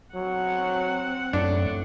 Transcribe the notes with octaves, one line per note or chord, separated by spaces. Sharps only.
F#3 C4 F#5
F#2 A2 D4